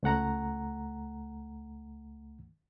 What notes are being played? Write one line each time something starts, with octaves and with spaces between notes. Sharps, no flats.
C#2 A3 F#5 A#5